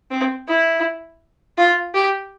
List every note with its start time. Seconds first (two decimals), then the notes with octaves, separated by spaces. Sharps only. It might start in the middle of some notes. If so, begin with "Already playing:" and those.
0.11 C4
0.48 E4
1.58 F4
1.95 G4